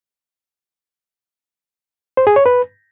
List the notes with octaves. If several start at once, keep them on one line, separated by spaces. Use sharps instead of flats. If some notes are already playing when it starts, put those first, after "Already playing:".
C5
G#4
C#5
B4